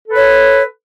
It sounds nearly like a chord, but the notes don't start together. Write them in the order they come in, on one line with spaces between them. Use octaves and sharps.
A4 B4 C#5